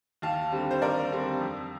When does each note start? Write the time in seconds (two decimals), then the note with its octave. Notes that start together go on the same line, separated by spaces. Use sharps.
0.22 D#2 F5 A5
0.52 D3 G3 C4
0.71 C5
0.82 D#2 A#4 D5
1.12 D3 G3 C4
1.41 F2